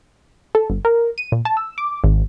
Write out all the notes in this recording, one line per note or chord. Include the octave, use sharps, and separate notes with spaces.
A4
G1
A#4
D#7
A#2
A5
E6
D6
G#1